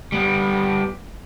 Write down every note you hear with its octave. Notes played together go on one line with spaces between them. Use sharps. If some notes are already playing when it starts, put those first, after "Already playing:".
G3 B3